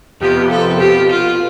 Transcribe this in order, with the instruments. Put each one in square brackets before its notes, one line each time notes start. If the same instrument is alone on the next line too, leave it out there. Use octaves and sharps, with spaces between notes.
[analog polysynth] F2 C3 F3 B3 F4 [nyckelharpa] G4
[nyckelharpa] A4
[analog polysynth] B2 B3 F4 [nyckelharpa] G4
[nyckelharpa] F4